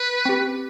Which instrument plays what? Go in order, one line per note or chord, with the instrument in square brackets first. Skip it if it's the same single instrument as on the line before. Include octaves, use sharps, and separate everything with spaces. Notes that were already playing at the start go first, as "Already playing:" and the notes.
Already playing: [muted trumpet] B4
[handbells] C4 G4